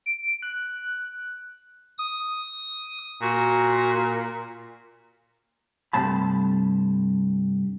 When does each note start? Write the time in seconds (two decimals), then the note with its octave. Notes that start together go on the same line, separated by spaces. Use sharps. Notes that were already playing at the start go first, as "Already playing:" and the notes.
0.06 D7
0.42 F#6
1.98 D#6
3.22 A#2 F#4
5.93 G2 C3 A3 A5 B5